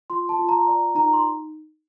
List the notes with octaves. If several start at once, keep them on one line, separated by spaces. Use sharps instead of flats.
F4 C6
A5
F4
A#5
D5 A#5
D#4 A#5
C6